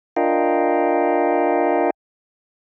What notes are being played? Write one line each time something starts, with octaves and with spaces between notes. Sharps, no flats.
D4 F4 A#4 D#5 F5 G5